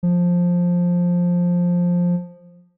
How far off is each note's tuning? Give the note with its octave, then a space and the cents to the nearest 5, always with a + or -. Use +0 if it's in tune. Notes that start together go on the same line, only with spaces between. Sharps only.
F3 +10